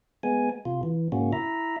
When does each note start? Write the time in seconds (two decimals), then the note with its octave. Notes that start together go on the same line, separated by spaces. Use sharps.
0.23 G#3 B3 G#5
0.65 C3 F4
0.83 E3
1.12 G#2 C#3 A#3 C#4 F#4
1.33 E4 E5 A#5